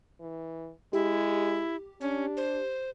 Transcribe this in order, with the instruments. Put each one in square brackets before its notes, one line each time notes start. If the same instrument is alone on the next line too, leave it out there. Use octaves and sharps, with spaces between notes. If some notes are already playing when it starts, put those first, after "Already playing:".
[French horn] E3
[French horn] G#3 [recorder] E4 [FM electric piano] G4
[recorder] C#4 [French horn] D4
[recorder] C5